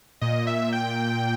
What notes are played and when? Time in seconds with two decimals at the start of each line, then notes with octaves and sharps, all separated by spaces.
0.21 A#2 D#5
0.47 E5
0.73 G5